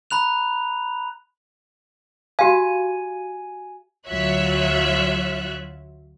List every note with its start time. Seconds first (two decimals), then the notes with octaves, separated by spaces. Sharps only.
0.11 A#5 B5 F#6 F7
2.39 F#4 G4 F5 G#5
4.08 D2 F#3 F4 C#5 E5 F#6